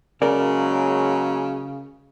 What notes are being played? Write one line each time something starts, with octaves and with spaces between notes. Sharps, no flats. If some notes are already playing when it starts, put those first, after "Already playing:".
C#3 F#3 G#3 A#3 A#4 D5